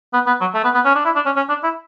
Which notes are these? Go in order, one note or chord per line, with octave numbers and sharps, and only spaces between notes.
B3
B3
F#3
A3
B3
B3
C#4
D4
E4
D4
C#4
C#4
D4
E4